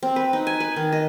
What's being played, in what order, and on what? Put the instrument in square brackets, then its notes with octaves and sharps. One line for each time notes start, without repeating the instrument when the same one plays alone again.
[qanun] C4
B4
D#4
G#5
B4
D#3
D#5